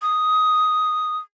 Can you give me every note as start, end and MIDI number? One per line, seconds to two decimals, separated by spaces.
0.02 1.18 87